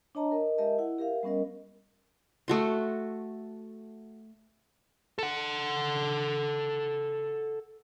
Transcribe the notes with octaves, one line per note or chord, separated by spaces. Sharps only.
D4 C#5 D#5 A5 A#5
A#4 D#5
G#3 G4 A#4 D#5 E5 A5
E4 F#5
G4 A#4 E5 F5
G3 B3 C#4 A#4 D#5
A3 F#4 C6
A4 F#5